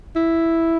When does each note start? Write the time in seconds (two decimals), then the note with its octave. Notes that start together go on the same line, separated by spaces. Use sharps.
0.15 E4